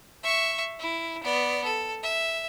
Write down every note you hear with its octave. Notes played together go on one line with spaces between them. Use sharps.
E5 C#6
E4
B3 D5
A4
E5